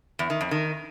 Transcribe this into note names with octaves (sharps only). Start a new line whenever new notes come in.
E2
D#3
F2
D#3